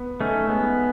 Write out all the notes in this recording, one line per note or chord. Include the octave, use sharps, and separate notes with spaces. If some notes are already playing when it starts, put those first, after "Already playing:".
Already playing: B3
A3 C#4 D#4
G#3 B3